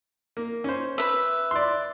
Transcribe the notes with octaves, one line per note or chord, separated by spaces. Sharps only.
A#3
C#4 C5
B4 E5
D5 C6